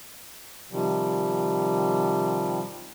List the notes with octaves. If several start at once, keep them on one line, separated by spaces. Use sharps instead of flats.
C3 D#3 F3 G3